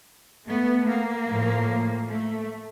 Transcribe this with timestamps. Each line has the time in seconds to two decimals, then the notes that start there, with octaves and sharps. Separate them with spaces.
0.47 A3 B3
0.87 A#3
1.27 A2 F3 A3
2.08 A3